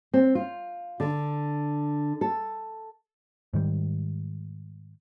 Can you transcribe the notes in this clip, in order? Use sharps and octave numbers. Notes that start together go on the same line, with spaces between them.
C4
F4
D3
A4
G#2 D#3 G3